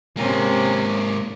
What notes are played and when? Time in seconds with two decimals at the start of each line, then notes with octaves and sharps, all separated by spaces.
0.17 G#2 C3 A#3 C#4